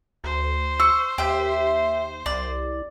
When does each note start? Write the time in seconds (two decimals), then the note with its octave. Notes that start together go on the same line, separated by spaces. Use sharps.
0.24 D2 C5
0.80 C#6 E6
1.18 D#2 G4 E5
2.26 C2 D5